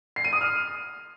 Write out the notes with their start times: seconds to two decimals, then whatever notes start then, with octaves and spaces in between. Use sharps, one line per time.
0.16 C7
0.25 D#7
0.33 D#6
0.41 F6